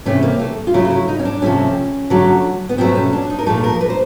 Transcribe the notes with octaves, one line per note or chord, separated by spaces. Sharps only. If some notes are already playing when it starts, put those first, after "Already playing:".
C3 E3 A3 C#4
A#3
A3
F4
C#3 F#3 A3 E4
F4
E4
D#4
C#4
D4
C3 F3 A3 C#4
D3 F#3 A3
B3
B2 F#3 A3 C4
C#4
D4
D#4
A#4
A#2 F3 A3 A4
A#4
B4
C5